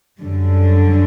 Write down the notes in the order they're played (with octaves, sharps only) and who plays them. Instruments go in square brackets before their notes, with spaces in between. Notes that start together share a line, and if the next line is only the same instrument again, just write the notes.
[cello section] F#2 D3 G3